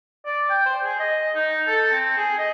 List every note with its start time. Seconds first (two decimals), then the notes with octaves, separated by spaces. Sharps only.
0.26 D5
0.50 G5
0.66 C5
0.84 G#4
1.00 D#5
1.35 D#4
1.67 A4
1.91 C4
2.18 G#4
2.38 D#5